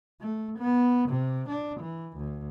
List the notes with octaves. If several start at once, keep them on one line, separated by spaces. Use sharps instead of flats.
A3
B3
C3
D4
E3
D2